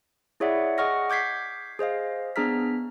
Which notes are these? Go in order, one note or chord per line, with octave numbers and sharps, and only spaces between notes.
E4 G#4 C#5 D5 E5 F#5
G#4 D#5 F#5 C#6 F6 A#6
D6 G6 G#6 B6 C7
G#4 C5 D#5 F5
B3 D4 G#4 A#5 F6 B6